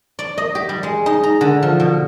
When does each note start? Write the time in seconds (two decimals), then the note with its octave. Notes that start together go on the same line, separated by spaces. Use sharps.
0.19 D5
0.38 D#5
0.55 G4
0.69 G3
0.83 G#3
1.06 D#4
1.23 A#5
1.41 D3
1.63 F3
1.80 B2